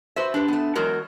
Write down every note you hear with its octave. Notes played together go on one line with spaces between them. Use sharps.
F#4 B4 C5 E5
D4 G4 B4
A3 B3
E2 F#3 G#3 F#4 A#4